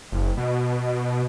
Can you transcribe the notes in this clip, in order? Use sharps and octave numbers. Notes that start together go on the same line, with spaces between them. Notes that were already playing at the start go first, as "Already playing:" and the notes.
F#1
B2